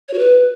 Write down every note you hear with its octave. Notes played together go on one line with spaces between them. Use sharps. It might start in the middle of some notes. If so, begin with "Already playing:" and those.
C#5
F#4
B4